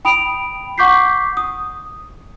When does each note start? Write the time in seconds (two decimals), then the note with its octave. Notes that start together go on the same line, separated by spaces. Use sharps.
0.05 G5 B5 D#6 D7 F7
0.78 F#5 C#6 D6 G6 B6 C7
1.37 D#6